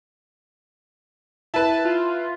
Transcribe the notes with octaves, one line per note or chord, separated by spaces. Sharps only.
E4 B4 A5
F4